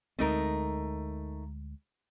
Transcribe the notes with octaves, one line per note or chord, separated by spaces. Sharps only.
D2 G#3 A3 C4 D#4 A#4